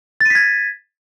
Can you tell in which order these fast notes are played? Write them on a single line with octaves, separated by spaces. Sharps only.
A6 D#7 B6 G#6